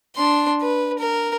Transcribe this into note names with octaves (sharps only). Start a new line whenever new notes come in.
D4 C6
B4
A#4